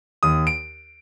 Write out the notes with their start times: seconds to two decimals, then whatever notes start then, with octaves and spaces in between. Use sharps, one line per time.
0.23 D#2 D#6
0.47 D7